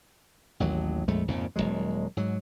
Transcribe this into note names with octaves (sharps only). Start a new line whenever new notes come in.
A1 D#2 F#3
A#1 F2 G#3 A3
A#1 F2 G#2 C#3
D#1 D2 F#3 G#3
G#2 F#3